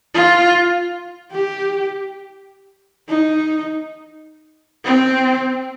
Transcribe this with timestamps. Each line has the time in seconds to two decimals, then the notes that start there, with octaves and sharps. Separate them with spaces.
0.15 F4
1.32 G4
3.09 D#4
4.85 C4